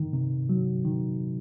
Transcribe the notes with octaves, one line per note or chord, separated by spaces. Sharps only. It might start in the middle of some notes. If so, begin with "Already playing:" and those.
Already playing: D#3
C3
F#3
D#3